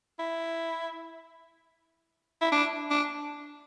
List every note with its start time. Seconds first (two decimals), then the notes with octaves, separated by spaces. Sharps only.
0.19 E4
2.41 E4
2.52 D4
2.91 D4